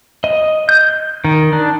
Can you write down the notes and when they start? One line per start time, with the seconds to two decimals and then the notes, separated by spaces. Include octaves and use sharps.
0.24 D#5
0.69 G6
1.24 D#3
1.53 D4